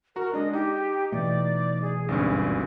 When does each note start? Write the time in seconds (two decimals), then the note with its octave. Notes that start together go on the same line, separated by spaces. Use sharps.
0.16 F#4 A#4 A#5
0.33 G#3 D4 D#5
0.53 D#4 G4
1.12 B2 E3 A3 D5
1.82 G#4
2.08 G#1 D2 G2 C#4